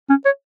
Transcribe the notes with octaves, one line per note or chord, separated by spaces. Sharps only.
C#4
C#5